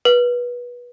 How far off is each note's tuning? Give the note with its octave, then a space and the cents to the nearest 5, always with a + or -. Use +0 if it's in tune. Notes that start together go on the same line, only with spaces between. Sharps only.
B4 -25